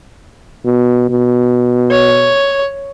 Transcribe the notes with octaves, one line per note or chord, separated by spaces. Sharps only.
B2
B2
C#5